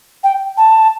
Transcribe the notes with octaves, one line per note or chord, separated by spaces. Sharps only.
G5
A5